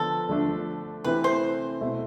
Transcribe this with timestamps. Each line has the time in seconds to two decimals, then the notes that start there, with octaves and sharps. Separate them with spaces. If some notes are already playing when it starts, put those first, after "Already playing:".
Already playing: D3 F3 B3 F4 A4
0.29 D3 F3 A3 D4
1.04 C3 E3 A3 C4 E4 B4
1.24 C5
1.81 B2 A3 E4